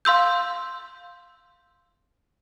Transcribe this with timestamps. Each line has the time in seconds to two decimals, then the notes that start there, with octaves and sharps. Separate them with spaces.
0.05 F5 C6 E6 G6